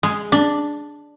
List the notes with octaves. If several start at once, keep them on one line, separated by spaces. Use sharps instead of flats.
G#3
D4